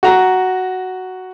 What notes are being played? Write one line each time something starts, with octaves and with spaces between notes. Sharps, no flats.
F#4 A#5